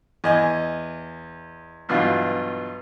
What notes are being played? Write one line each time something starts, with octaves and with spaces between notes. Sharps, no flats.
E2 D#5 G#5
G2 B2 E3 F#3 F4